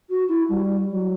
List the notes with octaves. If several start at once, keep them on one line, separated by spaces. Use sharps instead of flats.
F#4
E4
G3
F#3